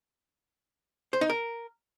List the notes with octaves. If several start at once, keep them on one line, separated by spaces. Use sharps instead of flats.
C5
D#4
A#4